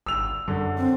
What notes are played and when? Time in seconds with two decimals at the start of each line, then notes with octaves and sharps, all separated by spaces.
0.06 G1 E6 F7
0.48 F#2 D3
0.78 C4